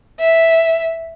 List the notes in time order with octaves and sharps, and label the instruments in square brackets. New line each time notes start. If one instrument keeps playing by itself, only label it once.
[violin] E5